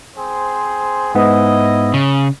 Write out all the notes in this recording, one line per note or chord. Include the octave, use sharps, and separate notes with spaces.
C4 G#4 C5
G#2 B3 E4 D#5
C#3